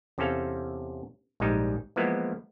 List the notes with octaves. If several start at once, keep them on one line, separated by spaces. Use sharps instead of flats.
E2 C3 C4 C#4 A4 F5
A#1 G#2 G3 G#3 D#4
E3 F3 G#3 A#3 B3